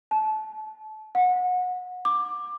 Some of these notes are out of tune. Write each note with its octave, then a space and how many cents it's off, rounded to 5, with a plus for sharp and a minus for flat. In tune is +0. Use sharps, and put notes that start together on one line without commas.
A5 -25
F#5 -30
D6 +10